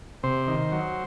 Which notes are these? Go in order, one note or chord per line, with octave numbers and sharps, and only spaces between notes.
C3 C5
D#3
F#3